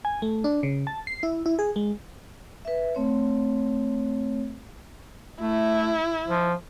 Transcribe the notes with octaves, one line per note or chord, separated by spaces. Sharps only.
G#5
A3
D4
C#3
A5
C7
E4
E4
G#4
G#3
B4 E5
A3 C4 C#5
A3 E4
F3